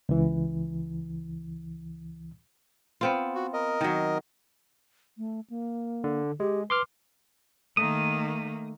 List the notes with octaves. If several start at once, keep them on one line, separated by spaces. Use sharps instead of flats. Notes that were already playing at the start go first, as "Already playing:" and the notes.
C#2 E3
B3 C4 F4
F#4
A#4 D#5
D#3 F#3
A3
A#3
D3
G#3 G4
B4 C6 D6 F6
D#3 A3 A#3 D#6